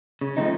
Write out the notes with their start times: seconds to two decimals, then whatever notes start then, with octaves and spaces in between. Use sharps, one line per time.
0.21 C#3
0.37 F3 A3 C4 D#4